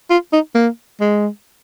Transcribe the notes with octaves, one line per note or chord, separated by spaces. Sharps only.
F4
D#4
A#3
G#3